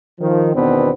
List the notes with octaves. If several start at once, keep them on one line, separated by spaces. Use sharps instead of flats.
D#3 F3
E2 B2 D#3 B3 C4 D4